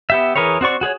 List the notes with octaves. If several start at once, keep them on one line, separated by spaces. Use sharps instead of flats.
B3 G4 E5
E3 G#4 A#4 B4 C#5
C4 F#4 D5 C#6
F#4 G#4 B4 C#5